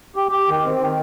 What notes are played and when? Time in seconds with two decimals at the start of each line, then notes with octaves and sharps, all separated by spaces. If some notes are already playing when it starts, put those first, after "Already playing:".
0.16 G4
0.32 G4
0.48 D#3
0.65 C4
0.80 D#3